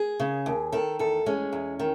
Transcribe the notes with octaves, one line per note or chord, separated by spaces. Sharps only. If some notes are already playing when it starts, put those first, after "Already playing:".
Already playing: G#4
C#3
D#2
D#3 A4
E2 A4
G#3 C#4
E2
D#3